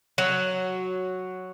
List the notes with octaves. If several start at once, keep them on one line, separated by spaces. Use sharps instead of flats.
F#3